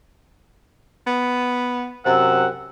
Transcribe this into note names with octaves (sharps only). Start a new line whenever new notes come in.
B3
F#2 C3 F#5 E6